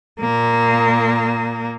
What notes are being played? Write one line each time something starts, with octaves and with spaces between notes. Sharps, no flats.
A#2 A#3